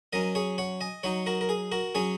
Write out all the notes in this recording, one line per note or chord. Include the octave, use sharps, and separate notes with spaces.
F#3 C#4 A#4 D#5
G#4 C#5
C#5 F#5
D#5 G#5
F#3 D#4 C#5 F#5
F#4 A#4
A#4
G#4
F#4 A#4
F#3 C#4 G#4 C#5